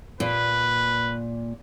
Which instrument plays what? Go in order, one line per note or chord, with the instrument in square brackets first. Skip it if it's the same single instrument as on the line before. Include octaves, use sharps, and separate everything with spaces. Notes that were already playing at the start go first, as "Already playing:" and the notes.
[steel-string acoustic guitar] A#2 [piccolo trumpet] B4